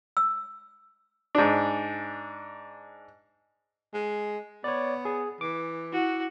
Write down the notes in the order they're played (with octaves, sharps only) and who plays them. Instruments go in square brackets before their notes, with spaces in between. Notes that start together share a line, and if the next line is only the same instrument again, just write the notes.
[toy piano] E6
[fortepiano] G#2 D4
[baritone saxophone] G#3
[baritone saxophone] B3 [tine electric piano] C#5 D5
[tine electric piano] G#4
[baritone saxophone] E3 [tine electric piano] D6
[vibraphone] E4 [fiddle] F#4